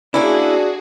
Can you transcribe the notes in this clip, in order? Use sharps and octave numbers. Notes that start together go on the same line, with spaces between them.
A#3 C#4 D4 E4 F#4 G#4